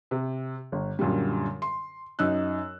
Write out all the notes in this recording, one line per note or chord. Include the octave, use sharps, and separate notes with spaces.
C3
G1
F#2 A#2 D3 G3
C6
F#2 D#4 E6 F#6